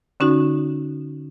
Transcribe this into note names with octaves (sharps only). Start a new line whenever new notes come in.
D3 C#4 D#4 F#4